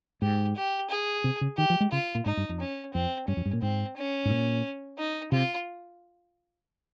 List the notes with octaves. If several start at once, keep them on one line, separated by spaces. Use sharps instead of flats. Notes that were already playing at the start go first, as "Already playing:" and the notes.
G#2 G4
G4
G#4
C3
C#3
D#3 G4
F3
G#3
C#3 F4
A#2
G#2 D#4
G2
F2
C#4
F2 C4
G2 C#4
F2
G2
A#2
G#2 C4
C#4
G#2
A#2
D#4
C3 F4